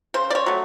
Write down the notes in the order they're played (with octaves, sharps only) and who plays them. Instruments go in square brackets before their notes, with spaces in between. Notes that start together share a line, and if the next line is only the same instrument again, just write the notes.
[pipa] C#3 C5
D5
C#5
F#3 A3